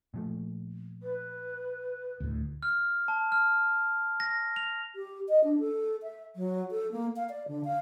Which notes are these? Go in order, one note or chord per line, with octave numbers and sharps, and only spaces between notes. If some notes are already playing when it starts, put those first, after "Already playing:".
A#2 F3 A3
B4
D2 A2
F6
A5
F6
A#6
F7
G4
D#5
D4
A4
E5
F#3
A4
A#3
F5
D5
D3
F5